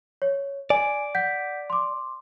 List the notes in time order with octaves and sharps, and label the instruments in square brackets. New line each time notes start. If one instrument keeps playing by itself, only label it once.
[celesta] C#5
[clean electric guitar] D5 [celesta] G#5
[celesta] F#5 G6 B6
C6 D6